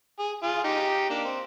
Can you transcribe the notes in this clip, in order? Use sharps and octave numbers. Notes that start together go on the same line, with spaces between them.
G#4
F4 G#4
D#4 G4
A#3 D4
C4